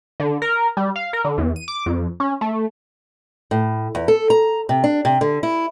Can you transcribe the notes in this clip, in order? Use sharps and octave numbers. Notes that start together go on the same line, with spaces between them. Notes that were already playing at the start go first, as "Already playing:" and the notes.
D3
A#4
G3
F5
A#4
D3
E2
D#7
D6
F2
C#4
A3
A2
E2
A4
A#5
C3
D4
C3
D3
E4